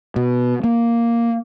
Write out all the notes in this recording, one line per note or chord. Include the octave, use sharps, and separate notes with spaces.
B2
A#3